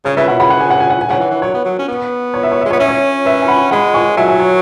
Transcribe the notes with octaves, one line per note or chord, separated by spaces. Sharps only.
C#3 C#5
C#3 B4 E5
B2 C#5 F#5
C#3 F#5 B5
F#5
G#5
F#5
G#5
F#5
G#5
C#3 C#5 F#5
E3
E3
F#3 C#5
B3
F#3
C#4
B3
C#5
E5
C#5
G#3 E5
B3 C#5
C#4 E5
C#5
B4 E5
G#5
F#5 B5
G#3 F#5 B5
G#5 C#6
F#3 E5 G#5
E5 G#5
C#5